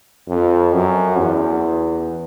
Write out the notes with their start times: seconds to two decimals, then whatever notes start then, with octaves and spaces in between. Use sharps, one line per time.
0.29 F2
0.74 F#2
1.19 E2